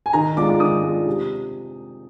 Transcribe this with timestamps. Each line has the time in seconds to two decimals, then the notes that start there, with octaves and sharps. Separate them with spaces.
0.06 G#5
0.13 D#3 A#5
0.37 G#3 D4 F4 D6
0.49 D6
0.60 D#3 D#6
0.83 G#3 D4 F4
1.06 C3